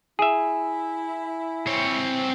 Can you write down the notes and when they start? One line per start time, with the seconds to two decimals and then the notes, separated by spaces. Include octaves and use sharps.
0.19 E4 G#4 E5 G#5
1.67 C4 C#5